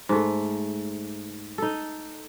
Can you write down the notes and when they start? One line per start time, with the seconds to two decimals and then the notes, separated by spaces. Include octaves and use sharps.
0.09 G#2 A3
1.58 D#4 A4